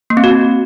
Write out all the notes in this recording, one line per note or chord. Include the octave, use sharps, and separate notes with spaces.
A#3
C4
F#4